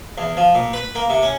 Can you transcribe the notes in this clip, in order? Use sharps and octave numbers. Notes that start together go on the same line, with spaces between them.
E2
F3
A#2
B4
A#3
C3
C#4